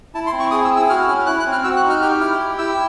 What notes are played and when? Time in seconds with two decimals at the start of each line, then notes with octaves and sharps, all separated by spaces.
0.15 E4 A5
0.27 C6
0.32 C4
0.40 C#6
0.51 G#4 D#6
0.65 E6
0.70 E4
0.76 E6
0.90 F#4 F6
1.08 C#4 F6
1.26 E4 F#6
1.39 F#6
1.46 C4
1.52 F6
1.64 F#4 E6
1.77 F#6
1.83 D#4
1.90 F6
2.02 G4 F6
2.20 E4 F6
2.39 G4
2.58 E4 E6